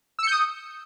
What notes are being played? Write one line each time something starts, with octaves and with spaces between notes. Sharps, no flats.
D#6 E6 G6 C#7